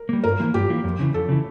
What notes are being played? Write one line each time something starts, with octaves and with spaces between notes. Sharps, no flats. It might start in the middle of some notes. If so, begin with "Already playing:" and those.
Already playing: A#4
G3 A#3
G2 A#4
E3 A#3
G2 G4
E3 A#3
F2
C#3 E3
F2 A4
C#3 E3